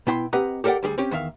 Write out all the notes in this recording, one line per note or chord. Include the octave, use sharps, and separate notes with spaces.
B2 B3 E4 G5 A#5 C6
C4 G4 B4 D#5 F#5 A#5
G4 A4 A#4 D5 F#5 G5
D2 G3 G4 G#4
C4 C#4 G4
E2 D#3 E5 F5